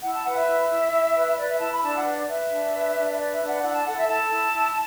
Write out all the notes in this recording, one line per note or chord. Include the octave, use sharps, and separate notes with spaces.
E4 F#5
A5
B4 F#5
E5
E4
E4
E4
B4
B4 D5
E5
E4 A5
B5
D4 A5
F#5
B4
D5
B4 E5
D4
B4
D4
B4 D5
E5
D4
F#5
E4 F#5
A5
A4 F#5
E5
E4 A5
E4
E4